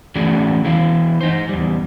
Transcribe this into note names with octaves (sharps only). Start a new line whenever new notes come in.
E3 A3 C#4 F#4 G#4 D5
E2 E3 E4 F5
D#4 C5
E2 G3